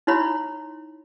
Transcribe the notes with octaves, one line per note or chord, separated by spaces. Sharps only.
D#4 E4 C#5 B5 C6